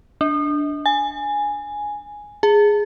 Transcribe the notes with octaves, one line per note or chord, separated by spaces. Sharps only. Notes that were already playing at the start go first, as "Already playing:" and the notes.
D4
G#5
G#4